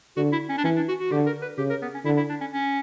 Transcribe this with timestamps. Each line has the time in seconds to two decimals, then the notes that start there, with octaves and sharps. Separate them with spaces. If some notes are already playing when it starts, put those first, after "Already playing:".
0.17 D3 F#4
0.32 E4
0.49 C#4
0.58 D4
0.64 E3 C#4
0.76 D4
0.88 F#4
0.99 F#4
1.11 D3 G4
1.26 A#4
1.42 B4
1.58 C#3 G4
1.70 A#4
1.82 B3
1.94 C#4
2.05 D3 E4
2.17 E4
2.29 D4
2.41 C#4
2.53 C#4